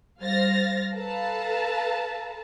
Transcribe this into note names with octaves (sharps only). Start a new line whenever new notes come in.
G3 C5 F5 F6 A6 A#6
A4 B4 F5 A5 A#5